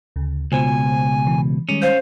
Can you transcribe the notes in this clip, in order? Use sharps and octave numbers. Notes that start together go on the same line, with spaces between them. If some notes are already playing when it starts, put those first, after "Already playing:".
D2 C#3
C#2 B2 F4 C5 G#5
E3
D#3 G3 G#3 C#4
C5 F5